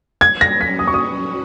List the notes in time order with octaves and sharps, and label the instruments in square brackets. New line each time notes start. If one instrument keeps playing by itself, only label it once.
[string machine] F#3 C#4 F#4 [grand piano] G#6
[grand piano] A#6
B6
D#6
C#6
D#6